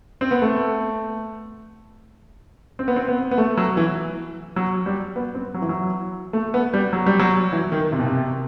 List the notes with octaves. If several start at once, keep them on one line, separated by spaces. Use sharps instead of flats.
C4
B3
A3
C4
B3
C4
B3
B3
A3
F#3
E3
F#3
G3
B3
C4
F#3
E3
F#3
A3
B3
G3
F#3
G3
F#3
E3
D#3
C3
B2
C3